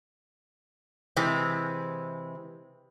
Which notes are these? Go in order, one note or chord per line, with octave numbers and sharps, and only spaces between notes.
C3 E3 G#3 C4